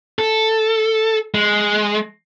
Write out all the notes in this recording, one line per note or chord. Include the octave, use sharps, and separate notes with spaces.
A4
G#3